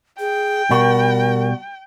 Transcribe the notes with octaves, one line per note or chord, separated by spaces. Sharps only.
G#4 G5
B2 G3 F#4 A#4